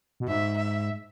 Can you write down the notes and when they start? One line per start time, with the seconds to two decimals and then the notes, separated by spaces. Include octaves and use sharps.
0.20 B2
0.28 G#2 E5
0.57 E5